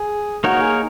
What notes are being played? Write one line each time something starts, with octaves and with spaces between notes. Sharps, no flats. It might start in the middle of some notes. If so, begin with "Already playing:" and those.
Already playing: G#4
A#3 D#4 F#4 A#4 C#5
G#4